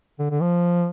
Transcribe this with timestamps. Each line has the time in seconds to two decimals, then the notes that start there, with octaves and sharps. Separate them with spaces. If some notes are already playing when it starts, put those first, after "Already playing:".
0.19 D3
0.31 D3
0.41 F3